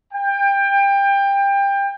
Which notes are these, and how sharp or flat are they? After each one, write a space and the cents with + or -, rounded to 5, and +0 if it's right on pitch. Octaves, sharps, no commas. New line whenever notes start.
G5 +25